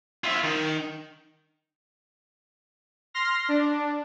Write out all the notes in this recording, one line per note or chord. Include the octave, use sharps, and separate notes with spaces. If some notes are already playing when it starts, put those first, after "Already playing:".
F4 E5
D#3
C6 F6 A#6
D4